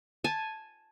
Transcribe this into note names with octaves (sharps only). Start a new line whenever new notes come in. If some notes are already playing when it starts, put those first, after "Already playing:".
G#5 A5